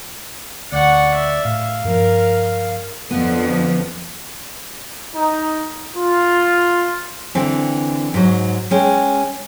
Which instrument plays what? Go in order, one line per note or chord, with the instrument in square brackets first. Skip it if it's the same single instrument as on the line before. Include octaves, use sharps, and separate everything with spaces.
[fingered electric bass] D2 [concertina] D5 [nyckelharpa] F#5 C#6
[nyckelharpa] E5
[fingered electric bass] A2 [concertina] F5
[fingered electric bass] G2 F3 [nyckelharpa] A#4
[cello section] F2 D3 F3 [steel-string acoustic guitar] B3
[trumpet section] D#4
F4
[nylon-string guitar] D3 E3 C4
G#2 F#3
G#3 C#4 G5